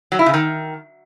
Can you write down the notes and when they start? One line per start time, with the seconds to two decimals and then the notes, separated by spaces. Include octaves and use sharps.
0.12 F#3
0.19 E4
0.26 C#3
0.34 D#3